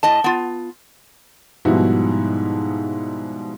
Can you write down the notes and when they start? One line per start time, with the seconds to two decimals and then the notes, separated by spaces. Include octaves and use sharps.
0.03 A2 D#5 A5
0.24 B3 F4
1.65 G#2 B2 F3 G3 E4 F#4